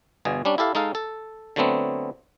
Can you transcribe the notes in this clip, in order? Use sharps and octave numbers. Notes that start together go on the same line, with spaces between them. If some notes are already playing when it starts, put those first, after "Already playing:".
G1 B2 G#4
G3 C#4 D4
E4 G4 A4 F5
G#3 D#4 A4 F5
A4
D3 F#3 A3 B3 C4